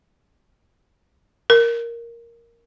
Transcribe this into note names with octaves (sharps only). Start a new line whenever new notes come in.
A#4